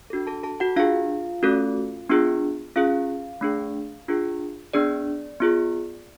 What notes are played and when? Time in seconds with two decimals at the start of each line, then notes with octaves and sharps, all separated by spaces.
0.10 D4 F#4 A4
0.27 A4 A5
0.43 A4 A5
0.60 F#4 F#5
0.76 D4 F4 G#4 F5
1.43 A3 C#4 F#4 A4
2.09 B3 D4 F4 G#4
2.76 C#4 F4 G#4 F5
3.41 A3 D4 G#4
4.08 D4 F4 G#4
4.73 B3 D4 G#4 D5
5.40 B3 F4 G#4